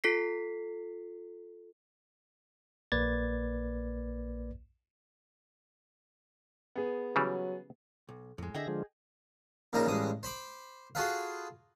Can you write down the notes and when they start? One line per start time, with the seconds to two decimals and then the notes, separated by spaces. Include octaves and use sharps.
0.04 F4 A4 B6 C7
2.92 A#1 A#3 B4 D5 G#6 A6
6.76 B3 G#4
7.16 C#3 E3 F#3 G3
8.09 B1
8.38 F2 A2 G#3
8.54 D3 G#4 D#5 E5 G5 A#6
8.68 D3 F3 G#3
9.73 A#1 A#2 C#3 D#4 A#4 A#5
9.86 A1 G2 G#3 D#6
10.23 C5 B5 D6
10.95 F4 F#4 G#4 A4 B4 F5